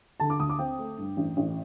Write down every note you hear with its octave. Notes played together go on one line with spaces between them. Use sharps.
D3 A5
D6
D2 D#6
D6
C4 G5
A3
G2
A1
A1